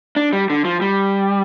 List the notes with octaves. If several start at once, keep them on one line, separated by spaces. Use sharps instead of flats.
D4
G3
D3
F3
G3